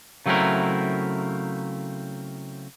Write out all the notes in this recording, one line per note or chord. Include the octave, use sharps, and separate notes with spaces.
C#3 F#3 A3 C4 E4 A#4